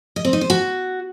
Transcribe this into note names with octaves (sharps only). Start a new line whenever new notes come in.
D#5
C4
D#4
C5
F#4